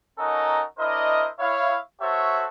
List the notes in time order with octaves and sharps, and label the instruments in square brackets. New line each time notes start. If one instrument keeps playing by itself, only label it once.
[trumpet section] C#4 D#4 F#4 A4 A#4 D#5
D4 E4 A#4 C5 D#5
E4 C#5 F5
F#4 A4 C5 C#5 E5